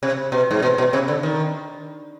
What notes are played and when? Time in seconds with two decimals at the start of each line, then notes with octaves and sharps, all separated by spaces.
0.03 C3
0.32 B2
0.51 G#2
0.62 B2
0.78 B2
0.93 C3
1.08 D3
1.23 D#3